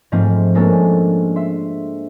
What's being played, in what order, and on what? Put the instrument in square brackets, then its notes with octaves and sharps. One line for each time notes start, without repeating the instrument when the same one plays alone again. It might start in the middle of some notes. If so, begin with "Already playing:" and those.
[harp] G#2 F3 A3 C4
G#3 A#3 C#4 D4 A4
E5 C6